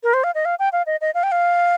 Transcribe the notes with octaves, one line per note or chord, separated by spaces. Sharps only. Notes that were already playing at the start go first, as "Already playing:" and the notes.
A#4
C5
F5
D#5
F5
G5
F5
D#5
D#5
F5
G5
F5